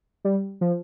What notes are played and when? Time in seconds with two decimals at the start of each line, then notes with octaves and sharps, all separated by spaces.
0.25 G3
0.61 F3